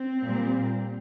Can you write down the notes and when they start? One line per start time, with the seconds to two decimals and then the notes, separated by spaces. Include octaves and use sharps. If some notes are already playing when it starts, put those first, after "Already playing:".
Already playing: C4
0.24 A#2 G3